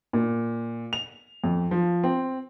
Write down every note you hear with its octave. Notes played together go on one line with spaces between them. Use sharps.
A#2
F7
F2
F3
C4